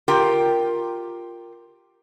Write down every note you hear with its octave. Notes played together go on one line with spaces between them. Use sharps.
F4 G4 A#4 G5